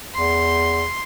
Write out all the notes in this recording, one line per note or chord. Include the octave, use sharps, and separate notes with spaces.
E2 C6